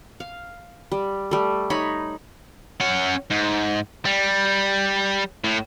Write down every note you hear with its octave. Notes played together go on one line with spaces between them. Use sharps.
F5
G3
G3 A3
D#4 C#5 B5
C#4 F#5
G#2
G3
A2